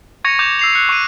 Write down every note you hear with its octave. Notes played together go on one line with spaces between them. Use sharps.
C#6 G#6 A#6 C#7 F7
D6 G6 F7
E6 C7 F7
F#6 C#7
C#6 D#7